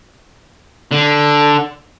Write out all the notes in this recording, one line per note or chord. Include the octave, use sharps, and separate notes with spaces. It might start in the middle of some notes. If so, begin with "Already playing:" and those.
D3